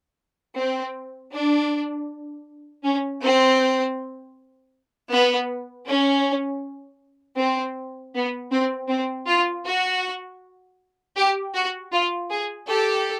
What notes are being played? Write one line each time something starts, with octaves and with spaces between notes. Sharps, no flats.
C4
D4
C#4
C4
B3
C#4
C4
B3
C4
C4
F4
F#4
G4
F#4
F4
G#4
G4 A4